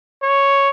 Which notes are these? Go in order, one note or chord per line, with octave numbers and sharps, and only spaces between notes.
C#5